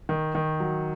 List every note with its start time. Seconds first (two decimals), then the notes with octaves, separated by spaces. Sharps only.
0.09 D#3
0.35 D#3
0.60 F#3